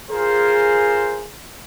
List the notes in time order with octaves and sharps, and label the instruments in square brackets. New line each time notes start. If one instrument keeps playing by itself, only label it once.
[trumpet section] F4 A#4 C5 [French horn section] G#4